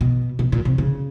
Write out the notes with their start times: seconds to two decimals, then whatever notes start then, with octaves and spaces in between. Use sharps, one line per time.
0.01 B2
0.39 B2
0.52 A#2
0.65 C3
0.78 C#3